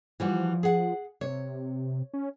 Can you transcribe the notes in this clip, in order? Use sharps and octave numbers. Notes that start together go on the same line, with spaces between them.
E3 F3 G3 F#4
G#4 F#5
C3 C#5
C#4